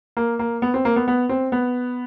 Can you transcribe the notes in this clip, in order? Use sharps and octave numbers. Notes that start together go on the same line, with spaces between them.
A#3
A#3
B3
C4
A#3
B3
B3
C4
B3